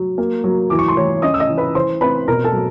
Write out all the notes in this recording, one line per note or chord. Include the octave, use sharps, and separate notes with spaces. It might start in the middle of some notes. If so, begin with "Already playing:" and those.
Already playing: F#3
A#3
F#3
E3 D6
C#6
C6
E3 C#5 C#6
C#4 D#5 D#6
E6
D#5 D#6
E3
B4 B5
E3 C5 C6
C4 B4 B5
B2 A#4 A#5
A4 A5
F#3